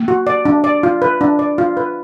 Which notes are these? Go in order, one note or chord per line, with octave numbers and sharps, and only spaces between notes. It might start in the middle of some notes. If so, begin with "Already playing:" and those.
Already playing: A#3
F#4
D5
D4
D5
F4
B4
D4
D5
F4
B4